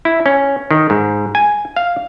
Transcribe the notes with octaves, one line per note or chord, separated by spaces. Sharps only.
E4
C#4
D#3
G#2
G#5
F5